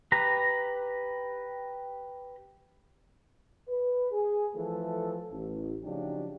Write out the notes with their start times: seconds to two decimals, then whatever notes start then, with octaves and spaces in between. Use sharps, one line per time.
0.12 G4 B4 A#5
3.68 B4
4.12 G#4
4.55 E3 F3 A3 A4
5.32 A1
5.83 C#3 F3 F#3 D4 D#4 G4